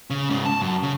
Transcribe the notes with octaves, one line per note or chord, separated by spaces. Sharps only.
C#3
G#2 C#3
A5
F#2
C#3